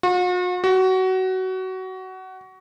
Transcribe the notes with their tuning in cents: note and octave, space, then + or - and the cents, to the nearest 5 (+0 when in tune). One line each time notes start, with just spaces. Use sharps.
F#4 -45
F#4 +20